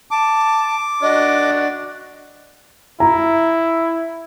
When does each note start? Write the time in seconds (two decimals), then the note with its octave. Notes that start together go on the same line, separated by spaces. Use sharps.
0.11 A5 D6
1.02 D4 F#4 D#5
3.00 E4 A#5